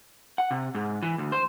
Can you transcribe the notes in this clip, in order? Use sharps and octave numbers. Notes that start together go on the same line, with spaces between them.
F#5
C3
G#2
E3
D2
C5